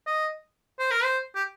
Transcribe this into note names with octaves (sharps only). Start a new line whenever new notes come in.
D#5
C5
A#4
C5
G4